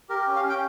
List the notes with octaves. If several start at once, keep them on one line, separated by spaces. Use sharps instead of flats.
G4 A#4
C#4
F5
C#4 G5